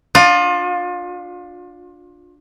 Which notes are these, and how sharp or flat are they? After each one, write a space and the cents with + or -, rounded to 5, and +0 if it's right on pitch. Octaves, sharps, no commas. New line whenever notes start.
D4 +0 F4 +25 D#5 -45